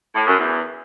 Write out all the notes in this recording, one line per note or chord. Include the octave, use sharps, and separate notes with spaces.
A2
F#2
E2